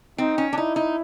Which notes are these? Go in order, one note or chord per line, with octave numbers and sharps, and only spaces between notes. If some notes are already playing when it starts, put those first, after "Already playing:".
C4 D#4
C#4
D4
D#4 E4
D#4